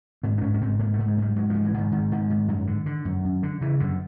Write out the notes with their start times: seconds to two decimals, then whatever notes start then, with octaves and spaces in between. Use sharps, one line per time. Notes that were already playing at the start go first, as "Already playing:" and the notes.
0.23 G#2 C4
0.38 D4
0.41 G#2 C#4
0.54 C#4
0.61 G#2 C4
0.79 G#2 A#3
0.94 G#2 A3
1.08 G#3
1.17 G#2
1.22 G3
1.36 G#2 F#3
1.50 G#2 F3
1.65 E3
1.74 G#2 D#3
1.92 G#2 D#3
2.12 G#2
2.30 G#2
2.48 F#2
2.67 D3
2.86 D3
3.05 F#2
3.25 F#2
3.43 D3
3.61 C#3 E3
3.80 F#2 D3